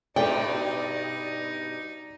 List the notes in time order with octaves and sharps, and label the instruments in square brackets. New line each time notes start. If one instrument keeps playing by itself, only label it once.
[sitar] G2 B2 [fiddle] D#4 [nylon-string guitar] A4 E5 G5 [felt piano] D5